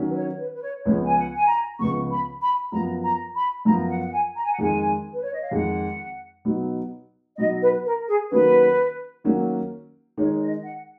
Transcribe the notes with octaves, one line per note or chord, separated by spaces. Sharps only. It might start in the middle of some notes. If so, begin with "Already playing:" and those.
Already playing: D#3 F#3 C#4
B4
C#5
B4
B4
C#5
C#2 C#3 F3 B3 C#5
G#5
F#5
G#5
A#5
C#2 C#3 F3 B3 C#6
B5
B5
F#2 F3 B3 F4 A#5
A#5
B5
F#2 F3 B3 F4 A#5
F#5
F#5
G#5
A#5
G#5
F#5
F2 D#3 G#3 G#5
B4
C#5
D#5
F5
F2 D#3 G#3 F#5
B2 F#3 B3 D#4
B2 F#3 B3 D#4 D#5
B4
A#4
G#4
D#3 F#3 A#3 C#4 F#4 B4
D#3 F#3 A#3 C#4 F#4
D#3 G#3 D#4 C#5
D#5
F#5